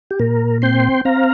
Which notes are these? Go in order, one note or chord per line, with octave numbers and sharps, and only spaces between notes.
G4
A#2 A#4
C4 G5 C6
C4 F5 A#5